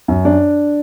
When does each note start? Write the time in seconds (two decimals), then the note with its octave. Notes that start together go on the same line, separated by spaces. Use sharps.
0.08 F#2
0.25 D4